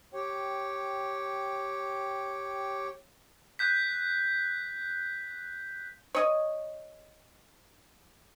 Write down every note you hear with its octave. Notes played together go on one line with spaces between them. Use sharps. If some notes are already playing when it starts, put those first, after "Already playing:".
G4 C#5 G5
F#6 G6 B6
C#5 D#5